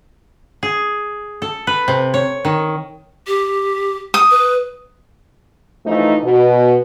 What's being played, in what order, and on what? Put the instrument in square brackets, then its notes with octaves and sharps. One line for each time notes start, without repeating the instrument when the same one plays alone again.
[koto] G#4
A4
B4
C3
C#5
D#3
[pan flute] G4
[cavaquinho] D#6
[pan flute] B4
[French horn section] E3 F3 A3 D#4
B2